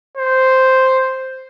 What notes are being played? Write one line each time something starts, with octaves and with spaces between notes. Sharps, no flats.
C5